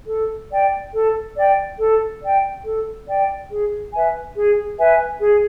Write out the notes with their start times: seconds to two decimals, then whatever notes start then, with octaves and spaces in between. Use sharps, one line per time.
0.07 A4
0.50 D5 G5
0.93 A4
1.36 D5 G5
1.79 A4
2.22 D5 G5
2.64 A4
3.07 D5 G5
3.50 G#4
3.93 B4 E5 G#5
4.36 G#4
4.79 B4 E5 G#5
5.22 G#4